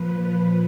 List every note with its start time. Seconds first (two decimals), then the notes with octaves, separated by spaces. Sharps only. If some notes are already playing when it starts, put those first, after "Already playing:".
Already playing: A#2 F3 B4